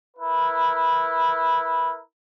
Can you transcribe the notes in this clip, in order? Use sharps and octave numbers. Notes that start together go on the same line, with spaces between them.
E4 A#4 B4